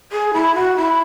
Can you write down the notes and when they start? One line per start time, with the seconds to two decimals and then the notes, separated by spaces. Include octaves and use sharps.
0.12 G#4
0.33 E4
0.55 F#4
0.76 E4